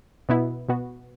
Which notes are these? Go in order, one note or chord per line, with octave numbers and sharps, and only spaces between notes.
B2 B3 E4
B2 B3 F#4